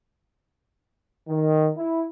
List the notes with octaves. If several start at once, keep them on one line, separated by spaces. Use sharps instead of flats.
D#3
E4